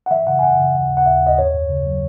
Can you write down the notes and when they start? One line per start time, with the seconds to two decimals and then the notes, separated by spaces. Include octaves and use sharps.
0.06 F#5
0.11 E3 E5
0.27 C#3 F#5
0.39 G#5
0.43 F#2 F#5
0.58 C#3
0.75 D#2
0.90 D#2
0.97 F#5
1.06 D#2 E5
1.22 D#2 D#5
1.38 F#2 C#5
1.54 F#2
1.69 C#3
1.86 F#3